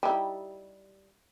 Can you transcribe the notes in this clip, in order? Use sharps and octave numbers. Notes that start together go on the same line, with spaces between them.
G3 D#4 E4